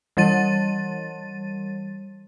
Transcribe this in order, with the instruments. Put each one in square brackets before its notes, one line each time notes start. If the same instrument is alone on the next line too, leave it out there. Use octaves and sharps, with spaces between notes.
[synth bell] E3 G3 A6 D#7